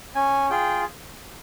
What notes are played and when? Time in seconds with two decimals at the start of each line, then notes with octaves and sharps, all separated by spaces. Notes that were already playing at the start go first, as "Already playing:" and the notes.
0.15 C#4 G#5
0.50 F4 G#4 G5